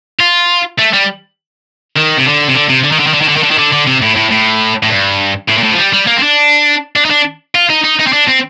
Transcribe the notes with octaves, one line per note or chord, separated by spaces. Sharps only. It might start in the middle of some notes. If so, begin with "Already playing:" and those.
F4
A3
G3
D#3
C3
D3
C3
D3
C3
D3
D#3
D3
D#3
D3
D#3
D3
D#3
D3
D#3
D3
D3
C3
A2
A2
A2
A2
G2
A2
A#2
A2
F3
G3
G3
A#3
C4
D4
D4
D#4
D4
F4
D#4
D#4
D#4
C4
D4
C4